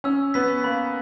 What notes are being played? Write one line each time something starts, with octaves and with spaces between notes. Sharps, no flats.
C#4 E6
B3 B6
A#3 B5